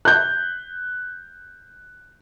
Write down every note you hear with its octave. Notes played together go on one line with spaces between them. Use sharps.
F#6 G6